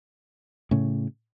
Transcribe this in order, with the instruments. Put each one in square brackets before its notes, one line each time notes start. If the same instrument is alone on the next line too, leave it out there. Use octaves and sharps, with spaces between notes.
[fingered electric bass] A2 C#3